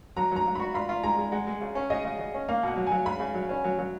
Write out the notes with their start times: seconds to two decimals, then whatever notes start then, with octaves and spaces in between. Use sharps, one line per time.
0.17 F#3 A#5
0.31 F#3 A#5
0.46 F#3
0.55 F#4 B5
0.74 F4 B5
0.89 F4
1.03 G#3 A#5
1.18 G#3
1.32 G#3 F#5
1.47 G#3
1.61 C#3
1.75 C#4
1.90 C#3 D#5
2.05 C#3
2.19 C#3
2.34 C#4
2.48 A#3 F5
2.63 B2 F#5
2.77 F#3
2.87 G#5
2.92 F#3
3.05 C#3 B5
3.20 C#3
3.34 F#3
3.49 C#4
3.64 F#3
3.79 F#3